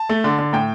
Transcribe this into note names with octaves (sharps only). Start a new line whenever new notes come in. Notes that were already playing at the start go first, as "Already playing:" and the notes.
Already playing: A5
A3
D3
D3
A2 G5